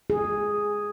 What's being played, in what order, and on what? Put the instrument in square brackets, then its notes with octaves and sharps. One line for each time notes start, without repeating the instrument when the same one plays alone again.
[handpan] G#4